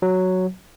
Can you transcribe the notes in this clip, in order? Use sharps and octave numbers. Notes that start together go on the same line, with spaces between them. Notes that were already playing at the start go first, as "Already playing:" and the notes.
F#3